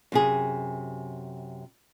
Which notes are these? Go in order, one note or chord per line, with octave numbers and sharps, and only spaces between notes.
F#2 C3 G#4